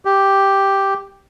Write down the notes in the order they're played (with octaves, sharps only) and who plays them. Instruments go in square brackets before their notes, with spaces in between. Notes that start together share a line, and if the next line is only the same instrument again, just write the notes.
[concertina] G4